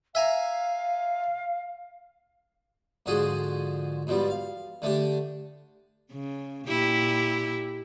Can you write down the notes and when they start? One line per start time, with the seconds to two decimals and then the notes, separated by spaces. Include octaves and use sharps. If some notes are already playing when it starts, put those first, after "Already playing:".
0.15 E5 F5 G#5 A#5
3.06 G#2 D3 F3 F#4 G#4 C6
4.07 G#2 B2 F3 G3
4.30 F5
4.82 D3 A3 D4 G4
6.12 C#3
6.68 A#2 E4 G4